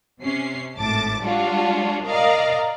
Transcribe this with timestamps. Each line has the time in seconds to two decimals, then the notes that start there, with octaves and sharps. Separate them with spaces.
0.20 C3 C#4 C7
0.78 G#1 A2 A5 D6 A6
1.22 G3 G#3 D4 F4 F#4 C#5
2.05 A#4 D5 D#5 F5 A#5